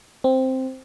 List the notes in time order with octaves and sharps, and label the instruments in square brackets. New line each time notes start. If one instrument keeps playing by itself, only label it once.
[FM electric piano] C4